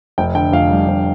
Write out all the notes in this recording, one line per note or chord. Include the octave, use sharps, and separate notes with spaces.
F1 G5
D3 G5
F1 F5
G3
F1